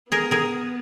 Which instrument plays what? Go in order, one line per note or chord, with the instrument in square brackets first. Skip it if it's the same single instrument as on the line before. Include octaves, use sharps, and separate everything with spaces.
[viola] B3 [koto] G#4 A#4
[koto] G#4 A#4